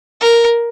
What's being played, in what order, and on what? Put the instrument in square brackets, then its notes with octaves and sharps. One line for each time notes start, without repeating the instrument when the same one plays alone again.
[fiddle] A#4